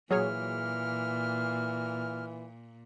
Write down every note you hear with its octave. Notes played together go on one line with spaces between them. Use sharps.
A#2 E3 F#3 G#4 C#5 F6